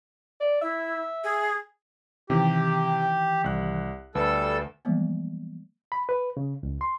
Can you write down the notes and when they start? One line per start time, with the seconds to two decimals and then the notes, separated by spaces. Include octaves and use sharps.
0.41 D5
0.62 E4 E5
1.24 G#4
2.30 C3 D#3 E3 G4
3.44 C2 F#6
4.15 D2 G3 A4 B4 E6
4.85 E3 F3 G3 G#3 A#3 B3
5.92 B5
6.09 B4
6.37 C#3
6.63 C#2
6.81 C6